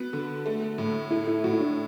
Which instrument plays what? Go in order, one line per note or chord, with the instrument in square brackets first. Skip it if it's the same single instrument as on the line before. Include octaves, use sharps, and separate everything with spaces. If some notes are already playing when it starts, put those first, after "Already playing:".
Already playing: [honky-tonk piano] B3 [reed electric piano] F#4
[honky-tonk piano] D3
A3
A2
[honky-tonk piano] A3 [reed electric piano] E4
[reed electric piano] E4
[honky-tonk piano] A2 [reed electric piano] F#4
[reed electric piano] E4
D4